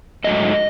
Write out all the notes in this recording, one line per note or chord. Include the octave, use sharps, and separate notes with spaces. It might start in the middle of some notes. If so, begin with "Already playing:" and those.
G#2 F#3 A3 D#5